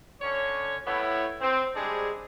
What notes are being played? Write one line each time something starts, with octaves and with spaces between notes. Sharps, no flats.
D3 C#4 C#5
A2 A3 B3 E4 C#5
C4
G3 G#3 C4 D4 G#4